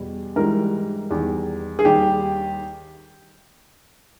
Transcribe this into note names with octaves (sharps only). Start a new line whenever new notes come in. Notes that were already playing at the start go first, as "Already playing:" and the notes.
Already playing: E2 B2 G3
G#2 E3 G3 A#4
E2 D#3 G3
G#4
D#2 D#3 G3 G4